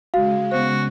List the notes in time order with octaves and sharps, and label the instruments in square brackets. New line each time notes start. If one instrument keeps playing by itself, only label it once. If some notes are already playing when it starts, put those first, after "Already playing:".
[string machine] C#3 G#3 [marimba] F#4 [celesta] F5
[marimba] B3 C5 [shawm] F#4